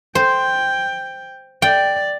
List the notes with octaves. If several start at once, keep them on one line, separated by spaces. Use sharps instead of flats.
C5 G5
D5 G5